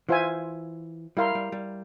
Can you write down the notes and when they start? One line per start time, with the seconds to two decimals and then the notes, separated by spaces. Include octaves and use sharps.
0.09 E3 F4 C5 E5 G#5
1.17 G3 E4 A#4 F5 C6
1.35 G3
1.52 G3